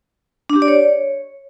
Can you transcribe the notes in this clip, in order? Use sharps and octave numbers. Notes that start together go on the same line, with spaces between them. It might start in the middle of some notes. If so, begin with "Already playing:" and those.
D4
G4
D5
C#5